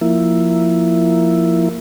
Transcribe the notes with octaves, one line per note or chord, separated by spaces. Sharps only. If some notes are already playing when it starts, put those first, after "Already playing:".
F3 A#3 E4